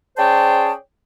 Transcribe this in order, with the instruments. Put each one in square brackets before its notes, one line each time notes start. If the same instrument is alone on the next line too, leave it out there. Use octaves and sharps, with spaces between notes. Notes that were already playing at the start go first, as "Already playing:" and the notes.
[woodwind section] C#4 G#4 C5 D5 G5 A5